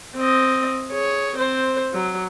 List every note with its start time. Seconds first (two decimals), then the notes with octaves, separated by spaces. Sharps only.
0.16 C4 D#5
0.91 G#4 C#5
1.36 C4 C5
1.93 F#3